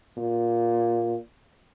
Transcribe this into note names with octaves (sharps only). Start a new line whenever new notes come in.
A#2